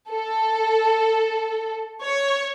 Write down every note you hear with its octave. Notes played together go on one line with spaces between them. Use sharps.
A4
C#5